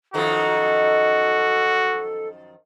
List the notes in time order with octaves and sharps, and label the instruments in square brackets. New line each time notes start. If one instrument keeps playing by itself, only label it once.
[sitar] F#2 D#3 F3 [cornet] F#4 [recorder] A4